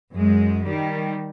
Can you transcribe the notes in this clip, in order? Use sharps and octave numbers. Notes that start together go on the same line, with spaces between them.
F#2 G#3
D#3 G3